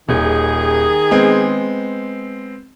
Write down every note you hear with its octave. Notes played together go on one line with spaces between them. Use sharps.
D#1 D#3 G#4
G#3 B3 C4